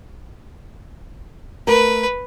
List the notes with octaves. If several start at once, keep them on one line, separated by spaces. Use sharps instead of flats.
A3 A#4 B4